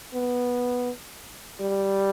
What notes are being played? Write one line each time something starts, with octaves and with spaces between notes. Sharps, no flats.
B3
G3